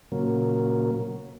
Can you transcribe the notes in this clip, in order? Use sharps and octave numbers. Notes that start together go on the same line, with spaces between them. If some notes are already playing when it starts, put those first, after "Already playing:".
A#2 C#3 F#3 A#3